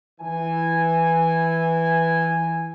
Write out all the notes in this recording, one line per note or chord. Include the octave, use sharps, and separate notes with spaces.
E3 G#5